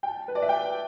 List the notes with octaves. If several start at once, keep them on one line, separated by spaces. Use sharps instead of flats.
G5
A5
B4
D5
E5
G5